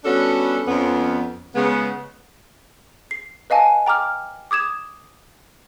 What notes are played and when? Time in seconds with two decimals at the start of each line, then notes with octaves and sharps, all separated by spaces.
0.04 G3 B3 C#4 D4 F#4 A4
0.67 F2 B3 C#4
1.55 C#3 G#3 B3
3.11 C7
3.50 B4 D#5 F5 G#5 A5
3.87 G5 A#5 D6 F6
4.51 D6 D#6 G#6 E7